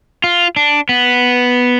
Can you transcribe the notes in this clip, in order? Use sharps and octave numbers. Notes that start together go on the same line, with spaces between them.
F4
D4
B3